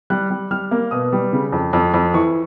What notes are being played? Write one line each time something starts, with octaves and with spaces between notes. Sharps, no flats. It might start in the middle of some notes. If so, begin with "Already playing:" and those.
G3 F#6
G3
G3 F6
A#3
B2 D#6
G3
C#3
F2
F2
F2
E3 C#6